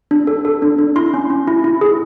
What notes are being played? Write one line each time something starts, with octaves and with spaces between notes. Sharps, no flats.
D4
A4
A4
D4
D4
E4 C6
C#4
C#4
E4
E4
G#4